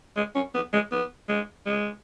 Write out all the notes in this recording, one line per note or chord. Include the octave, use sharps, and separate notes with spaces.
G#3
C#4
B3
G#3
B3
G#3
G#3